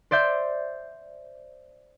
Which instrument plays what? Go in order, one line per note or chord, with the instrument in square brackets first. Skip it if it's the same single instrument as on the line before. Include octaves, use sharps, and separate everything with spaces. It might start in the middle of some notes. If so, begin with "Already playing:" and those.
[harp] C5 D5 E5 G6